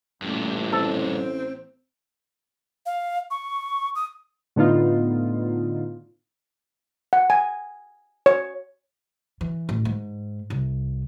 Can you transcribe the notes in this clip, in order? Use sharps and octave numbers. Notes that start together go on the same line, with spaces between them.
A1 G2 A#2
C4 A4
F5
C#6
D#6
A2 D3 B3 D#4 F4
F#5
G#5
C#5
E3
A1
G#2
C2